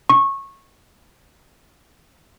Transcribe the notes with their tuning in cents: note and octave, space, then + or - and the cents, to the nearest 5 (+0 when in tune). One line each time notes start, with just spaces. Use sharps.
C#6 -20